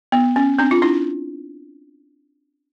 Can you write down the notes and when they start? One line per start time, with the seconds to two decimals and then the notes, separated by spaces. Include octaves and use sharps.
0.12 B3
0.36 C#4
0.59 C4 D4
0.71 F4
0.82 D4 E4